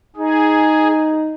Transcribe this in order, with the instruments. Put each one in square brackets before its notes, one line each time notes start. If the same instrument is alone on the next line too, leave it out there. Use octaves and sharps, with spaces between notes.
[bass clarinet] D#4 [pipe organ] G#4